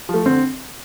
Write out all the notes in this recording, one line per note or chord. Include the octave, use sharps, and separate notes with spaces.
F3 A3
D3 C4